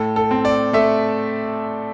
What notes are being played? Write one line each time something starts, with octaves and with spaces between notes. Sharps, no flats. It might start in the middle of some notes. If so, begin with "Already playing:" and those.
Already playing: A2 A4
A4
C4
D5
A3 E5